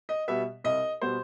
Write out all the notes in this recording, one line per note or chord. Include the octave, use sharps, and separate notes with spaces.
D#5
B2 G3 B3 E5
C2 D#5
B2 G3 B3 C5